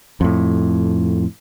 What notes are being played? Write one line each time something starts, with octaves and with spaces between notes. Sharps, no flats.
F2 A2